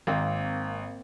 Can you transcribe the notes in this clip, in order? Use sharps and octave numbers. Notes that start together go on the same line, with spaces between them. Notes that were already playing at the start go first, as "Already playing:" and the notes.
G#1 A#3 C4